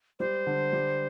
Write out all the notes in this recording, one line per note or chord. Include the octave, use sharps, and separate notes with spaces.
G3 C5
D3
G3